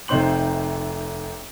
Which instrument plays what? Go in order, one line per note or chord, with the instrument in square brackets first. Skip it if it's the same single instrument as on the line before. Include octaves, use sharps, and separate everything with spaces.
[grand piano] F1 C3 D#4 C5 C6 F#7